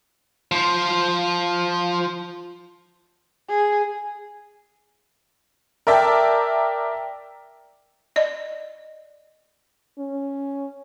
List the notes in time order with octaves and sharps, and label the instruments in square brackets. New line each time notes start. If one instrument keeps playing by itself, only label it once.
[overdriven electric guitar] F3 C5
[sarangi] G#4
[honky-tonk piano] A#4 D5 E5 G5 A5
[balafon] D5 D#5
[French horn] C#4